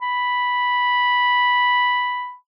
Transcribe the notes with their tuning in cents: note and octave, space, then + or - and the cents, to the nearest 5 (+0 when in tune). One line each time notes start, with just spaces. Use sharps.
B5 -5